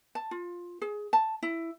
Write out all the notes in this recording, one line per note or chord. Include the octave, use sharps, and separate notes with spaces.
A5
F4
G#4
A5
E4